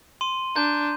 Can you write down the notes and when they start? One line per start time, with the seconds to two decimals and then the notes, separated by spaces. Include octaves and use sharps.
0.21 C6 D#7
0.55 D4 A#5 G6